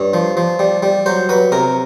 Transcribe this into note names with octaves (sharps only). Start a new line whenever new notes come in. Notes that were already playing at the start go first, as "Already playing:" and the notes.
Already playing: G2 C#5
F3
F3
G3
G3
F#3 C5
F#3 B4
C3 A#4